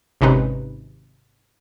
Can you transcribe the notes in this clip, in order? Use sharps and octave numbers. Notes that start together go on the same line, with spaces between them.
G#1 C3 C#4 D#4 B4